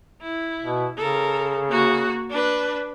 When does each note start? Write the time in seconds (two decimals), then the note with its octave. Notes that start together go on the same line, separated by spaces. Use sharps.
0.22 E4
0.63 B2
0.97 C#3 A4 A#4
1.68 A#3 F#4
2.30 D4 B4